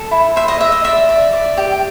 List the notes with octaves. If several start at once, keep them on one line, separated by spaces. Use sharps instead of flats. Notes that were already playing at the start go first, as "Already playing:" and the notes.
Already playing: A4
E4
C5 E5
D#5
D#5 E5
D#5
D5 E5
D5
D5
G4